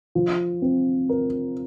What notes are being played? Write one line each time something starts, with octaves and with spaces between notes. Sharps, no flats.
F3
C4
A#4